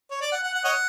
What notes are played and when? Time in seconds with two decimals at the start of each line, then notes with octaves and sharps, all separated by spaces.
0.11 C#5
0.21 D5
0.32 F#5
0.43 F#5
0.54 F#5
0.64 C#5 D#5 F#5